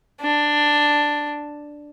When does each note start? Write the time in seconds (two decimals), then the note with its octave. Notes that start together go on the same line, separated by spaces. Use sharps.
0.22 D4